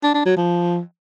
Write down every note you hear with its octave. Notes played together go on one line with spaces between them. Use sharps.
D4
D4
F#3
F3